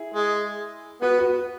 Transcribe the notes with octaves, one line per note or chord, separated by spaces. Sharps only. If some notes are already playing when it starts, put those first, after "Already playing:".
Already playing: E4 G#4
G#3
B3 F#4 B4
F#4 B4